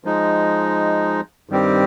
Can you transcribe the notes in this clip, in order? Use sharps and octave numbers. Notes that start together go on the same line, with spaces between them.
F3 G#3 D#4
G2 D#3 G3 C4 G4